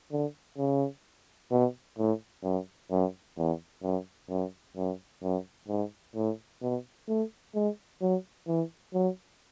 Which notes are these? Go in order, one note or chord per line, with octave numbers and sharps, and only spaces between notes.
D3
C#3
B2
A2
F#2
F#2
E2
F#2
F#2
F#2
F#2
G#2
A2
B2
A3
G#3
F#3
E3
F#3